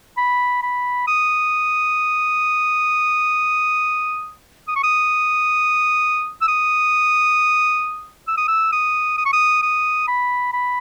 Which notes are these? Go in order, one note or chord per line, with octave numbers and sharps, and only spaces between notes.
B5
B5
D#6
D#6
C#6
D#6
E6
D#6
E6
D#6
E6
D#6
D#6
C#6
D#6
D#6
B5
B5